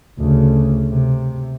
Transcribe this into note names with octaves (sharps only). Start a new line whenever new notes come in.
D2 C#3
C3